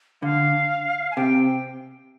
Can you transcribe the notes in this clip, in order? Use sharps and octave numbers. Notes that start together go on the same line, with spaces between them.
D3 F5
G#5
C3 G5